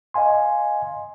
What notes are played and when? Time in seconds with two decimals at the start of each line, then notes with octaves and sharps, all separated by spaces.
0.14 D#5 F5 G#5 C6